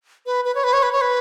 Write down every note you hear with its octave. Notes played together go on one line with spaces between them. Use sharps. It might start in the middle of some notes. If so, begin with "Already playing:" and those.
B4
B4
C#5
B4
C#5
B4
C#5
B4